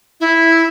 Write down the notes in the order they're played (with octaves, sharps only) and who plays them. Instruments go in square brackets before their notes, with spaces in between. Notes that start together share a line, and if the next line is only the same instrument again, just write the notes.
[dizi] E4